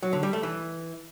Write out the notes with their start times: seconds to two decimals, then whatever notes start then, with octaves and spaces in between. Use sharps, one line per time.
0.03 F#3
0.13 D3
0.23 G3
0.33 A3
0.43 E3